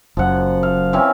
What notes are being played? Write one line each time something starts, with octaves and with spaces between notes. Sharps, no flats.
F#1 F#2 F3 F#5
F5
E3 C4 C#4